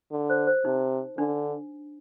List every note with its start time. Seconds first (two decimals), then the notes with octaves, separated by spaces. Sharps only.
0.11 D3
0.30 C5
0.47 C5
0.65 C3 D#4
1.18 D3 D4